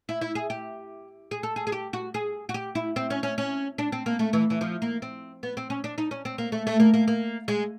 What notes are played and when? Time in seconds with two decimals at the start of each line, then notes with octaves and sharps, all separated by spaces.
0.09 E4
0.21 E4
0.35 G#4
0.50 G4
1.31 G#4
1.43 A4
1.56 G#4
1.67 G#4
1.72 G4
1.93 F#4
2.14 G#4
2.49 F#4
2.54 G4
2.75 E4
2.96 C4
3.10 C#4
3.23 C#4
3.38 C#4
3.78 D4
3.92 C4
4.06 A#3
4.19 A3
4.33 E3
4.50 E3
4.61 F3
4.82 A#3
5.02 C4
5.43 B3
5.57 C4
5.70 C#4
5.84 D4
5.98 D#4
6.11 C#4
6.25 C4
6.38 A#3
6.52 A3
6.67 A3
6.80 A#3
6.94 A#3
7.08 A#3
7.48 G#3